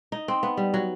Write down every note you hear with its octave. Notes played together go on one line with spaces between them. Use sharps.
D#4
C4
B3
G3
F#3